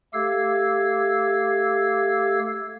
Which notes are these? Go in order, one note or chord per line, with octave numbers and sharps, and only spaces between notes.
A3 G4 A4 F5 E6 G#6